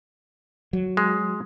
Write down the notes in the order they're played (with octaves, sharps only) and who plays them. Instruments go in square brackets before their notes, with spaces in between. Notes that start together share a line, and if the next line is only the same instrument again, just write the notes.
[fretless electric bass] F#3
[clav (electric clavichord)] G#3